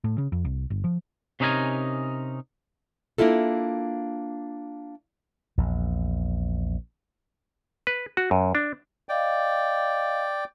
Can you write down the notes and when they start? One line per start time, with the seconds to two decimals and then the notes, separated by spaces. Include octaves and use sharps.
0.04 A2
0.18 C#3
0.32 F2
0.45 C2
0.70 G1
0.84 F3
1.40 C3 C#4 D#4 E4 A#4 G#5
3.18 A#3 D4 E4 F4 A4
5.58 A#1 E2
7.87 B4
8.17 F#4
8.31 F#2
8.55 D4
9.09 D5 D#5 F5 G5